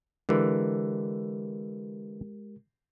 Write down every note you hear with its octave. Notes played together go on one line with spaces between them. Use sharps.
D3 E3 G#3 G4 A#4